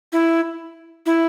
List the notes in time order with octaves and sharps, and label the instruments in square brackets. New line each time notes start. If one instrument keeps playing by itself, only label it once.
[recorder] E4
E4